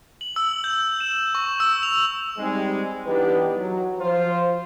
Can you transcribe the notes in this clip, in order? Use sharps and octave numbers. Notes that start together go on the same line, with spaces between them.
F#7
E6
G6
E7
C#6
E6
F7
G3 G#3 C4 D#4
E3 B3 D4 D#4 G4 B4
F#3
F3 F4 C5